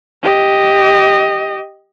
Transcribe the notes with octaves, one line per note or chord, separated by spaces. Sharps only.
G4 D#5